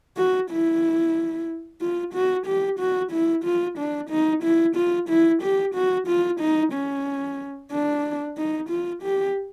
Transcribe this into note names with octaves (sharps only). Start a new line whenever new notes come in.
F#4
E4
F4
F#4
G4
F#4
E4
F4
D4
D#4
E4
F4
E4
G4
F#4
F4
D#4
C#4
D4
D#4
F4
G4